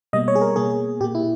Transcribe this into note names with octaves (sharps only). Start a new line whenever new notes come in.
B2 G3 A#3 D#5
C#5
G#4
A#4
B2 A#3 G#4
A#2 A#3 G4
E4